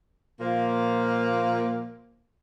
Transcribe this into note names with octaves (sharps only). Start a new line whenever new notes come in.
A#2 F3 A#3